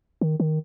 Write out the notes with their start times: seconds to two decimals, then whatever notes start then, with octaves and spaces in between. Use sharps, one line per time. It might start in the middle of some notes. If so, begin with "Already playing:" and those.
0.21 D#3
0.40 D#3